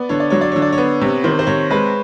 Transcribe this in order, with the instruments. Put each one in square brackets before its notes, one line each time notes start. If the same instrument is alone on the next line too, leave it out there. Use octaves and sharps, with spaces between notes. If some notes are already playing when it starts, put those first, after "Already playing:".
Already playing: [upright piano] B3 [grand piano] D5
[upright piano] D3 [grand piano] C#5
[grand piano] D5
[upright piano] F#3 [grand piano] C#5
[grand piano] D5
[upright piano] D3 [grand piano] C#5
[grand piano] D5
C#5
[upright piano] B3
[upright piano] C3 [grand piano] C#5
[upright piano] D#3 [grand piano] C5
[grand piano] C5
[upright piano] C3 [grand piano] C#5
[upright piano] G#3 [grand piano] B4